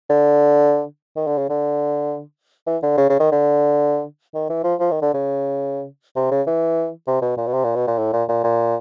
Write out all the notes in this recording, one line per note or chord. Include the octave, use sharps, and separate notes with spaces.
D3
D#3
D3
C#3
D3
E3
D3
C#3
C#3
D#3
D3
D#3
E3
F3
F3
D#3
D3
C#3
C3
C#3
E3
C3
B2
A#2
B2
C3
A#2
B2
A#2
A2
A#2
A#2
A#2